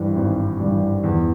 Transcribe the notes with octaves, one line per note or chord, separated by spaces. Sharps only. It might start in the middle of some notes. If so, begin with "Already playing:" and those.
Already playing: G#1 G2 E3
G#1
G2 E3
E2